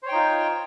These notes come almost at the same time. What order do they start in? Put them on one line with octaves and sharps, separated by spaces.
C5 C#5 G5 D#4 F4